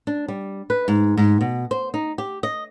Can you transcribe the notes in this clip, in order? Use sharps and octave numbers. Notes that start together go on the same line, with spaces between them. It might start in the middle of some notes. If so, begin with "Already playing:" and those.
D4
G3
B4
G#2
G#2
B2
C5
D#4
G4
D#5